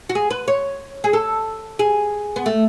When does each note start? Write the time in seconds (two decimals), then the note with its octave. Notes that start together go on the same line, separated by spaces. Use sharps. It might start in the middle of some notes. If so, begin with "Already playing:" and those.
0.09 F#4
0.15 G#4
0.30 B4
0.48 C#5
1.04 G#4
1.13 A4
1.79 G#4
2.36 B3
2.46 A3